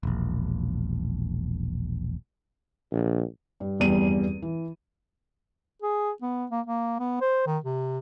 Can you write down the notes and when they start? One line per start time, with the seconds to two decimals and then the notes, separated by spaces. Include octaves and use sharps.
0.03 E1 A#1
2.92 A#1
3.60 G2
3.80 F1 E2 G2 G3 D#7
4.42 E3
5.82 G#4
6.22 B3
6.51 A#3
6.66 A#3
6.99 B3
7.21 C5
7.47 D#3
7.64 C3